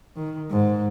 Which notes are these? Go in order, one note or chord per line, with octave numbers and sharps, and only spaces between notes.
D#3
G#2